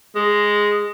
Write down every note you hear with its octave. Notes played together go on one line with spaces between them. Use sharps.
G#3